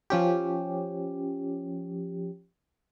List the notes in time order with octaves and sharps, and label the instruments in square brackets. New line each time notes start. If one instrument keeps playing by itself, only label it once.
[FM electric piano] F3 C#4 G4